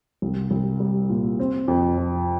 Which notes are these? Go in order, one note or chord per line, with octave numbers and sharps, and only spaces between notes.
C2
C2
G3
A#2
C4
F2
F3